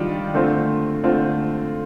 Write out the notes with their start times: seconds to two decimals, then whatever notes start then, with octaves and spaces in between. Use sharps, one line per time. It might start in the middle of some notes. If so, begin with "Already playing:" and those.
Already playing: D#3 G3 D4 F4
0.34 D3 A3 C4 F4
1.03 D3 A3 C4 F4